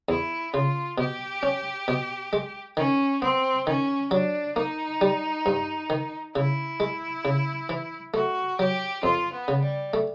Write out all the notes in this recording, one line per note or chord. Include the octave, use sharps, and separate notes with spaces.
E2 E4
C#3 F4
B2 G4
C#4
B2
G#3
D#3 C#4
B3 C4
D#3 C#4
F#3 D4
A#3 D#4
G3
G2
D#3
C#3 E4
G#3
C#3
E3
A3 F#4
F#3 G4
F2 F4
B3
C#3
G3
A3